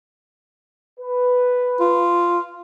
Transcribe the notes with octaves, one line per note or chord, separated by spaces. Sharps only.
B4
F4